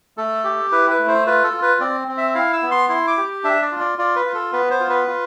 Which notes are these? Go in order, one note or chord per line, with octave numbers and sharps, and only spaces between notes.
A3 A4
G4
E4 B4
B4
A3
C5
F4 B4
A4
F4
B4
C4 D5
C4
E5
E4 F5
E6
B3
C6
E4 C6
D6
G4
D4 E5
D5
F4
D5
F4 D5
B4
F4
A4
B3 B4
C5
F4
B4
F4